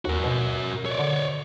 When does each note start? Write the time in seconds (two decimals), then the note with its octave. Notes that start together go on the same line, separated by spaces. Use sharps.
0.05 D#2 F#4 A#4
0.24 B2
0.86 C#5 D5
0.99 D3